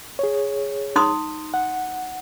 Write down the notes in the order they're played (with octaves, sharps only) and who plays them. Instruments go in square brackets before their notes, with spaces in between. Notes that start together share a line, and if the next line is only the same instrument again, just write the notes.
[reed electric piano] G#4 C#5
[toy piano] D#4 C6 D#6
[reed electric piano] F#5